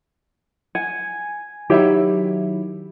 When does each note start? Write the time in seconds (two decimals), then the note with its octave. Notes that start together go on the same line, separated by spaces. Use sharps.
0.75 F#5 G#5
1.70 D#3 F#3 E4 G4 C#5 E5